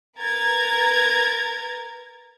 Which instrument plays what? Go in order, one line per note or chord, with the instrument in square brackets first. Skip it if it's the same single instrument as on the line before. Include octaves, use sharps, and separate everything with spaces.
[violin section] A#4 B4 A#5 G#6 A6